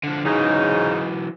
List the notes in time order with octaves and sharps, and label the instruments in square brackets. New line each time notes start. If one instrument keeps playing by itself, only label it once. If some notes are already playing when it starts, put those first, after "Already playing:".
[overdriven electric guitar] D3 F3
[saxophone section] G#2 C#3 D#4 [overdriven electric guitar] E3 F#3